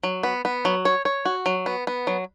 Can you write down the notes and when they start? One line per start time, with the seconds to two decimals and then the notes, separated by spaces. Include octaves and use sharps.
0.03 F#3
0.23 B3
0.45 B3
0.65 F#3
0.85 C#5
1.05 C#5
1.25 F#4
1.46 F#3
1.66 B3
1.87 B3
2.07 F#3